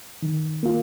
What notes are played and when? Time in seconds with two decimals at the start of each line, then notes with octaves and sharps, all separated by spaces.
0.22 D#3
0.63 A#3 F4